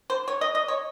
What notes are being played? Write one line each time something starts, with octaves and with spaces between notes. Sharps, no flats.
C5
C#5
D#5
D#5
C#5